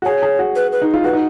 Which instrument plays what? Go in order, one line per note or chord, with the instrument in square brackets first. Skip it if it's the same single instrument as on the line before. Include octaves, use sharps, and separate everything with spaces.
[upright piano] F#4
[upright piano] G#4 [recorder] C#5
[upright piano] G#4
F#4
[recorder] B4
B4
[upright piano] D#4
F4
[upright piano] F#4 [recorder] B4
[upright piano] D#4